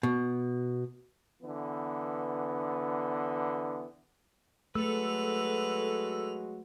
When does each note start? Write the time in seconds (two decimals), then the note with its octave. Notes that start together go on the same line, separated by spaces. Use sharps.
0.03 B2
1.42 D3 E3 B3
4.75 F#3 G#3 A3 F#4 A4 B4 F7